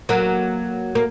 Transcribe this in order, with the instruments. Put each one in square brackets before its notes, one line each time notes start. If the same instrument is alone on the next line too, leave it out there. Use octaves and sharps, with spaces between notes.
[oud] F#3 A#3
A#3